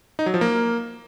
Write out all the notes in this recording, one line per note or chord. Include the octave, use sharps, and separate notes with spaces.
D#4
F#3
F3
A#3